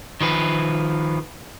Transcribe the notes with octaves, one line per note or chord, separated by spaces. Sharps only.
D#3 F3 B4